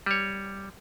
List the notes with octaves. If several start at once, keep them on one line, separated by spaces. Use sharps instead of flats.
G3 C#5